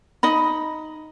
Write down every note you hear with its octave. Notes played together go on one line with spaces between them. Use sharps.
D#4 D#5 B5